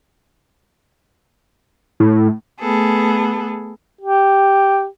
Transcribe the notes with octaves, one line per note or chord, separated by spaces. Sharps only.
A2
A3 B3 G#4 A4
G4